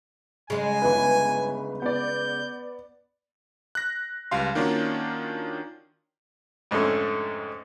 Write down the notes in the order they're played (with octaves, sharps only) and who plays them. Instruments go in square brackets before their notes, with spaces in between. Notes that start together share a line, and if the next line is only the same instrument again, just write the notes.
[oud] C#3 G#3 [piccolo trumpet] G#5
[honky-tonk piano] G1 B4
[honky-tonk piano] B3 D5 [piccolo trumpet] G6
[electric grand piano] F#6 A#6
C#2 G3 F5 C6
D#3 A#3 C#4 D4 F4 F#4
[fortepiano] F2 G#2 D3 A3 C#4